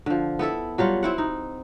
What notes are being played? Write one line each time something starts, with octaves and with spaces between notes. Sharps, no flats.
D3 F3
B3 E4 A4 E5
F#3 G3 F4 F#5
C4 E4 F#5
D#4